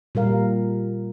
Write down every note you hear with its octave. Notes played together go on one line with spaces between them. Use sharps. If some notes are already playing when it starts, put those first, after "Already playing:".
A#2 G3 A#4 F5